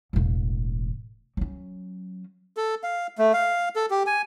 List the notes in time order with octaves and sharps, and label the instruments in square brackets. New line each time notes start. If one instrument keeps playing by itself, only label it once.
[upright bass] E1 A1
F#3 C#4
[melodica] A4
F5
A3
F5
A4
G4
G#5